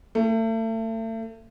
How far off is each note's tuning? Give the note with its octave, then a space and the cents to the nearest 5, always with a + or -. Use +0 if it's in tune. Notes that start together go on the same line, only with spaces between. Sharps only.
A3 +35